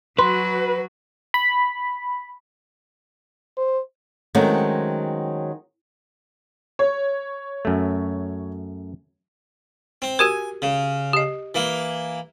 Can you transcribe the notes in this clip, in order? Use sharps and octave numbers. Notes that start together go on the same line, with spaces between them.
F#3 F#4 B4 C6
B5
C5
D#3 F#3 G#3 A3 C4 C#4
C#5
F#2 A3
C4
F#4 G4 A#4 G#5
C#3
G4 D#5
E3 A#3